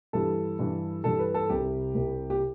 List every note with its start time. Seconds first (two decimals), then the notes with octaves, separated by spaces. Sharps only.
0.13 G2 E3 G3 A4
0.59 G2 E3 G3
1.04 G2 E3 G3 A4
1.19 B4
1.34 A4
1.50 C2 C3 G3 G4
1.95 C2 C3 G3
2.30 G4